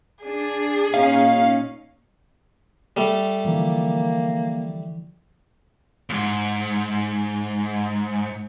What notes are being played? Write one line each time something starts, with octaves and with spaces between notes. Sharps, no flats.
D4 G#4
A#2 C#4 D#4 F5
G3 A3
D3 E3 F3 A#3
D#2 G#2